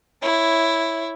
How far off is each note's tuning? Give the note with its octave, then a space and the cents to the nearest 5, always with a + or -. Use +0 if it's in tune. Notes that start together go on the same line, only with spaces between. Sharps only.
E4 +0 C#5 +0